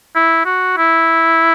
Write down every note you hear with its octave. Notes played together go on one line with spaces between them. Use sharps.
E4
F#4
E4